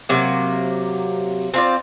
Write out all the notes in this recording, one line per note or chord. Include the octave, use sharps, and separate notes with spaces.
C3 F#3 A#3
C4 F4 D5